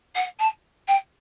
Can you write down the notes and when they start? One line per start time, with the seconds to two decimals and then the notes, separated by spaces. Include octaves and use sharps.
0.15 F#5
0.39 A5
0.87 G5